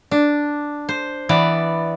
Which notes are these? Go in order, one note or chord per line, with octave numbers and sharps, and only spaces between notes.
D4
C5
E3 B3 D5